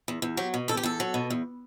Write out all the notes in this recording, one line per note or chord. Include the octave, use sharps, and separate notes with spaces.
E2
E2
F#3 G4
B2
E2 A4
G4
E2 A4
F#3
B2
E2